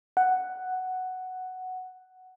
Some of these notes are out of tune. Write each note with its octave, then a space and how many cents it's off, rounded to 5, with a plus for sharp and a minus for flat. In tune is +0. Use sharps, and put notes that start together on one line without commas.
F#5 +5